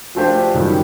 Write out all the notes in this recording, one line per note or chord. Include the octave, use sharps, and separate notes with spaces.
F3 A3 D4 G4 C5
F#2 D#3 G3